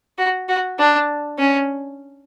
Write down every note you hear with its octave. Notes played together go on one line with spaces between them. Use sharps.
F#4
F#4
D4
C#4